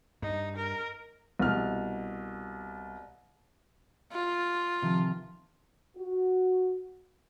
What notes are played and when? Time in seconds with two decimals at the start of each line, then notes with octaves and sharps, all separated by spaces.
0.22 G2 D#4
0.57 A#4
1.39 C2 B2 F6
4.12 F4
4.82 C3 D#3 F3
5.96 F#4